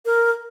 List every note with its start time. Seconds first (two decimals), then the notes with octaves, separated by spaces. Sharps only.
0.06 A#4